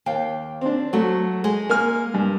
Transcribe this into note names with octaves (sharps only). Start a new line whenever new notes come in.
D#2 F5 G5
C4 D4
F#3 A3 F#4
G#3
A#3 G#5 F6
G2